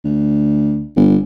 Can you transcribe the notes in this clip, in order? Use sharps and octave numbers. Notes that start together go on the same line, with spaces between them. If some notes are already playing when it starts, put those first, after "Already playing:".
D2
G1